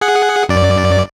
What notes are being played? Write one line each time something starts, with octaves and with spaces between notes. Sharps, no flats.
G#4 F#5
F#2 D5